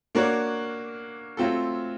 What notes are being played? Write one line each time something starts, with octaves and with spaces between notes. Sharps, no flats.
A#3 D4 F#4 A#4 C#5
F#3 A3 C4 F4 A4